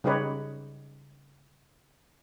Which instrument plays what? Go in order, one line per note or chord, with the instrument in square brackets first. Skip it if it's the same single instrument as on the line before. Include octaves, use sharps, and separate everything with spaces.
[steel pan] C#3 G3 D#4 G4 B4 C#5